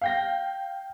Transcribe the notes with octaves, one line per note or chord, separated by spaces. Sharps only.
F5 G5 A#6